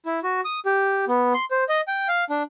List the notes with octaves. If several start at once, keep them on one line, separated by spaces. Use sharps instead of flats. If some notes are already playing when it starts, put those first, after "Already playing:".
E4
F#4
D#6
G4
B3
C6
C5
D#5
G5
F5
D4